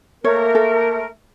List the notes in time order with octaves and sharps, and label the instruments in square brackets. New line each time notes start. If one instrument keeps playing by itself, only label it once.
[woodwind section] A3 A#3 A#4 [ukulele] C#5
[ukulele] A4